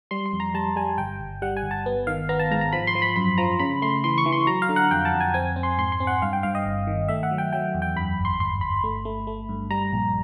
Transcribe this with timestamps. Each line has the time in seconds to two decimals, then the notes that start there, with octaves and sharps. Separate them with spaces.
0.11 G3 C6
0.26 C6
0.33 F2
0.40 A#5
0.54 G3 A5
0.76 G3 G#5
0.98 G1 G5
1.20 G1
1.42 G3 F#5
1.57 G#5
1.63 G1
1.71 A5
1.86 B3
2.07 D#3 F5
2.29 B3 A#5
2.39 A5
2.51 G#2 A#5
2.61 A#5
2.73 F3 B5
2.87 C6
2.95 F3
3.02 B5
3.16 F#2 B5
3.38 F3 A#5
3.59 C#3 B5
3.82 A3 C6
4.04 E3 C6
4.18 C#6
4.26 E3
4.32 C6
4.47 F#3 A#5
4.62 F5
4.69 D3
4.76 F#5
4.91 F2 G5
5.05 A5
5.13 F2
5.20 G#5
5.34 C4 G#5
5.56 C4
5.63 C6
5.78 G#2 C6
5.92 C6
6.00 C4
6.07 F#5
6.22 G2 F5
6.33 G5
6.43 G2 F5
6.55 D#5
6.66 G1
6.87 D#3
7.09 A3 E5
7.23 F#5
7.31 F#3
7.38 G5
7.53 F#3 G5
7.74 E2
7.82 G5
7.96 F#2 B5
8.18 G1
8.25 C6
8.40 G1 C6
8.61 G1 B5
8.84 A3
9.05 A3
9.27 A3
9.49 G2
9.71 G3 A#5
9.93 A#1